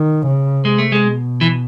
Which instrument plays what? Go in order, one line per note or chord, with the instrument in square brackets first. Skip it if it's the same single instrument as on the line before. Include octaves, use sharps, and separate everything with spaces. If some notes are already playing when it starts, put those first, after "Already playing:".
Already playing: [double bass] D#3
C#3
[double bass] C3 [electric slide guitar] G#3
[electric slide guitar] A3
G#3
[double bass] B2
[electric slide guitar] E3